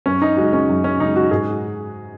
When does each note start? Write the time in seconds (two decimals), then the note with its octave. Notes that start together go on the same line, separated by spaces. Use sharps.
0.06 F#2 C#4
0.22 D#4
0.37 C#3 G#3 F#4
0.53 C#4
0.69 F#2
0.84 C#4
1.00 C#3 G#3 D#4
1.16 F#4
1.31 G#2 G#4